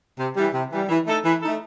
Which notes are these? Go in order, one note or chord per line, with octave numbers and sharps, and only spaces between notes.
C3
E3 G3
C3
E3 G3
E3
A3 D#4 A4
E3
A3 D#4 A4